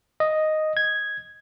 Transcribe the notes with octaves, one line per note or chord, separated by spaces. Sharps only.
D#5
G#6